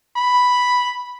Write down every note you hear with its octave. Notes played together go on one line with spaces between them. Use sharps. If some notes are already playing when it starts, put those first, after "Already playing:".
B5